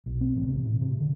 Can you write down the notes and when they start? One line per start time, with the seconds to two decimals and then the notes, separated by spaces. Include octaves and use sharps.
0.06 B1
0.21 C4
0.36 A1
0.48 C3
0.65 A2
0.81 C3
1.01 D3